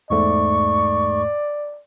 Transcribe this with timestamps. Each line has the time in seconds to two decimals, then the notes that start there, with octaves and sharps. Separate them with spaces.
0.10 E2 G#2 A3 D5 C#6